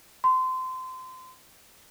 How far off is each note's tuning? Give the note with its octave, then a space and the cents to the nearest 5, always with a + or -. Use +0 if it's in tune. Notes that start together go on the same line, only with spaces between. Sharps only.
C6 -25